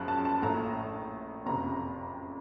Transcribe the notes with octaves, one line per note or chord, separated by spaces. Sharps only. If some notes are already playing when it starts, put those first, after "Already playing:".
Already playing: F#1 F#2 C#3 F3 F#6
A5
A5
A#1 A2 A3 A#5
F#1 F2 C3 A#5